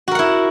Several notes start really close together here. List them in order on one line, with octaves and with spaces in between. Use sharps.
F#4 A#4 F#5 E4